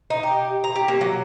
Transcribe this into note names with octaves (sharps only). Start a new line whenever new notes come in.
D#4
G4
A#5
G4
A#3
F#3